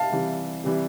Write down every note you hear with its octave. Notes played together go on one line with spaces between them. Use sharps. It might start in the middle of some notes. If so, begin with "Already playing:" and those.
Already playing: F5 A5
C3 E3 G3
C3 E3 G3